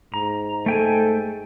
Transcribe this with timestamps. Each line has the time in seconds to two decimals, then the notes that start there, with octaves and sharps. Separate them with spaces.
0.14 G#2 A#5
0.66 A3 A4 G5 G#5